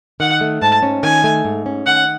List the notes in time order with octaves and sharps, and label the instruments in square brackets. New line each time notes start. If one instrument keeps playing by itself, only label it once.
[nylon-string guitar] D#3 [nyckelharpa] F#5
[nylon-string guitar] A3
[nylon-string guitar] G#2 [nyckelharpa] A5
[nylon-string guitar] C#4
[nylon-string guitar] D#3 [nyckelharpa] G#5
[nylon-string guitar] A3
G#2
C#4
[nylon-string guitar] D#3 [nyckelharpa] F#5